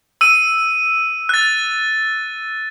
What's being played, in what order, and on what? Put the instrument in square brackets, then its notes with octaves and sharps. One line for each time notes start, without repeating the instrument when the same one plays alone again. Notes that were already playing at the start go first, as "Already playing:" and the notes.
[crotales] E6 D#7
F#6 A6